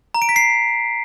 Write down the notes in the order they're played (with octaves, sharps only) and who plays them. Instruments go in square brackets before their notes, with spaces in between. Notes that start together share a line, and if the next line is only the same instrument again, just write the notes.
[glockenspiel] A#5
D7
B6
C7